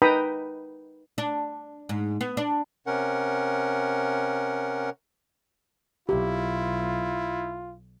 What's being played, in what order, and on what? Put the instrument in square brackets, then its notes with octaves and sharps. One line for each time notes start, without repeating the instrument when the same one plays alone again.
[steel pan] D#4 B4 G5 A#5 B5 D#6
[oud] D4
G#2
B3
D4
[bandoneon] C3 C#4 A#4 F#5
[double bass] B1 [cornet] E4 [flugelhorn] F4 [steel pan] G4